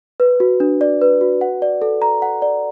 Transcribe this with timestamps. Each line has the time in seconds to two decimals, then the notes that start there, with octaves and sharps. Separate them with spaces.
0.20 B4
0.40 F#4
0.60 D4
0.81 D5
1.01 B4
1.21 F#4
1.41 F#5
1.62 D5
1.82 A4
2.02 A#5
2.22 F#5
2.42 D5